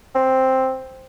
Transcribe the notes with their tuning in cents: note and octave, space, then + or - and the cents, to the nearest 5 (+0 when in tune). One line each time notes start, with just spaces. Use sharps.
C4 +5